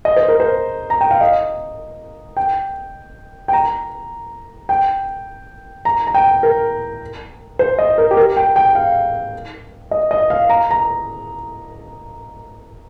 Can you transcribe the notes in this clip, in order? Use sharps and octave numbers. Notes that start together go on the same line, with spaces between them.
D#5
C5
A#4
C5
A#5
G5
F5
D#5
G5
G5
A#5
G5
A#5
A#5
G5
A#4
C5
D#5
A#4
G4
A#4
G5
G5
F5
D#5
D#5
F5
A#5
A#5